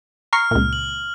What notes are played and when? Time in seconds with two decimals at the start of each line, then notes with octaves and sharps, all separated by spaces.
0.33 A#5 C#6 F6 C7
0.51 C#2 A#2
0.73 F#7